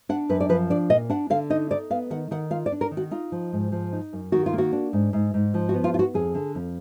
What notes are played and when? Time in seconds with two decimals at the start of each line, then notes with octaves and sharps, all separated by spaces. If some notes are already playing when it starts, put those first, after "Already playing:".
0.09 D4 F#5
0.29 F#2 B4
0.40 D5
0.49 F3 B4
0.70 D4 D5
0.90 A#2 D#5
1.10 D4 F#5
1.30 D3 F5
1.50 D#4 D#5
1.71 D#4 D5
1.90 B3 F5
2.10 D#3 F#5
2.31 D#3 F#5
2.51 F4 F5
2.66 D5
2.72 D4
2.81 A#4
2.91 D#3
2.97 F#4
3.11 D#4 F4
3.32 F3
3.53 G#2
3.72 F3
3.93 D#4
4.13 F#2
4.32 D#3 F#4
4.46 F4
4.53 A#3
4.58 F#4
4.73 D4
4.93 G#2
5.13 G#2
5.34 G#2
5.54 F3
5.69 F#4
5.74 B3
5.84 F4
5.94 F4
5.99 F#4
6.14 F2 G#4
6.35 D3
6.55 F2